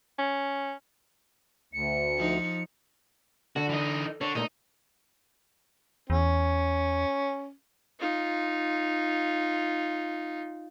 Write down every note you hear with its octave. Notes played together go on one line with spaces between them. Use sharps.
C#4
D2 C#7
F3 D#4
D3 F#4
E3 D#4
D3 C#5
A#2 G#3 A3 D#4
E2 C#4
D#4 F4